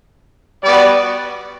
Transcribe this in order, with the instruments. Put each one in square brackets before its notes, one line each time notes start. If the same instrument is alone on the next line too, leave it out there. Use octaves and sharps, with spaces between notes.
[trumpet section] G3 B3 F#4 D5